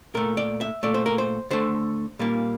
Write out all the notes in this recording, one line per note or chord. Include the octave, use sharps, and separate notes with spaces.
A#2 A3 A#4
D5
E5
A#2 A3 D5
C5
A#4
C5
D3 A3 C5
A#2 G3 A#3